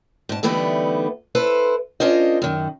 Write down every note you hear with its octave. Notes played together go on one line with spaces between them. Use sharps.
G#2 A5
D3 E3 G3 A3 B3 D#4
E4 A4 B4 C5
C#4 D4 F4 A#4 C5 D#5
F#2 D#3